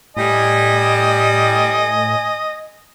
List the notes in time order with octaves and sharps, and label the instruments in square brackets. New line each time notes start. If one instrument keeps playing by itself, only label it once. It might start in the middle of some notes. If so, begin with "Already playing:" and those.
[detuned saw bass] A2 [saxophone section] G3 [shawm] D#5 [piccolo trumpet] G#5